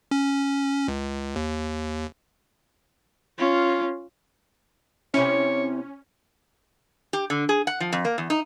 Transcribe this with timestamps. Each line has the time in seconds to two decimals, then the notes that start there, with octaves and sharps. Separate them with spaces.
0.11 C#4
0.88 C#2
1.36 D#2
3.38 C#4 F4
5.14 C3 C#4 E4 C#5
7.13 G4
7.30 D3
7.49 G#4
7.67 F#5
7.80 F3
7.92 F2
8.05 A#3
8.18 E2
8.30 D#4